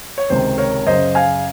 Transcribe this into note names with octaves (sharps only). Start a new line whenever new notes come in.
C#5
C#2 C3 D#3 C5
A#4 C#5
F#2 C#3 C5 D#5
F5 G#5